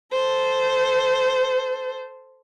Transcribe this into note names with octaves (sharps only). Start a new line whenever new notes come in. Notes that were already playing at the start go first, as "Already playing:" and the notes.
A4 C5